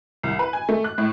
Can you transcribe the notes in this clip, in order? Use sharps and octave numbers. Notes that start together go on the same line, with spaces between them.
C2
B4
G#5
A3
F#6
A2